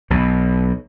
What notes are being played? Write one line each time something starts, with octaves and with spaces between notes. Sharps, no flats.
B1 B2